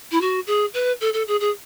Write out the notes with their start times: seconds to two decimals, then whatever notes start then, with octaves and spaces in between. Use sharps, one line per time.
0.11 E4
0.21 F#4
0.47 G#4
0.74 B4
1.01 A4
1.13 A4
1.27 G#4
1.40 G#4